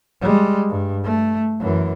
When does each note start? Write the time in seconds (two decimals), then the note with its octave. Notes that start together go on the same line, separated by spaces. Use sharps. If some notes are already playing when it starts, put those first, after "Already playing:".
0.21 G3 G#3
0.69 G2
1.04 A3
1.60 F#2 E3